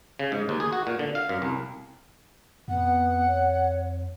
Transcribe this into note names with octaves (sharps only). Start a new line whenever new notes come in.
C#3
G#2
D#2
G#4
F#4
A#2
D3
F5
F#2
C2
F2 B3 F#5
C#5